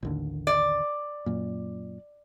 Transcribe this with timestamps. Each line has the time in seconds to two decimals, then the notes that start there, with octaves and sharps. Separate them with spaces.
0.03 A1 D#2 D3
0.47 D5
1.26 F#2 A#2